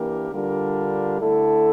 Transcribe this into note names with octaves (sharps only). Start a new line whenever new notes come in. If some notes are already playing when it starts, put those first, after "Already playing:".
Already playing: E3 A#3 D4 G4 A#4
D3 G3 D4 F4 A#4
D3 A3 E4 A4